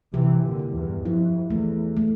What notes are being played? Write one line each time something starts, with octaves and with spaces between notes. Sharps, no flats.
C3 E3 G4
A#2 D3
E4
E2 G2
F2 E4
E2 A3
A3